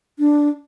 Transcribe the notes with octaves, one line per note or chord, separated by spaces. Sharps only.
D4